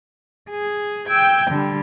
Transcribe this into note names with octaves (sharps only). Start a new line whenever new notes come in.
G#4
G5 E6 G6 G#6
D3 G3